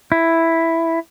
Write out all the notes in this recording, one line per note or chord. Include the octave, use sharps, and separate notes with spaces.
E4